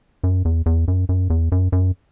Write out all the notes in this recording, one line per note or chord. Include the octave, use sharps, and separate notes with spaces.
F#2
E2
E2
F#2
F#2
E2
F#2
F#2